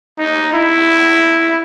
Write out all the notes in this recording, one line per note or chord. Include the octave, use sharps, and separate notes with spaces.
D#4
E4